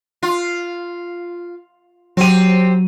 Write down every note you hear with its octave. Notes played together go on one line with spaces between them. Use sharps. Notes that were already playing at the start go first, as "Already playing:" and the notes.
F4
F#3 C4 G4 D#7